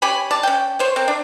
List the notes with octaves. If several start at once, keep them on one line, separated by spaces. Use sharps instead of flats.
C#4 G4 G#5 B5
D5 A5
C#4 G5
C5 C#5
C4 A#4
D4